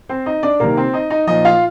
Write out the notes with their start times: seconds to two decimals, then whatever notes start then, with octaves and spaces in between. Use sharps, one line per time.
0.09 C4 C5
0.26 D#4 D#5
0.43 D4 D5
0.60 C3 D#3 A#3 A#4
0.77 C4 C5
0.93 D#4 D#5
1.10 D#4 D#5
1.27 A#2 F3 D#4 D#5
1.45 F4 F5